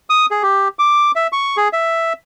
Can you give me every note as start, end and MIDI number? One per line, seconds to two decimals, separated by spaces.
0.10 0.26 87
0.31 0.43 68
0.43 0.68 67
0.79 1.11 86
1.16 1.27 76
1.32 1.57 85
1.57 1.68 68
1.73 2.13 76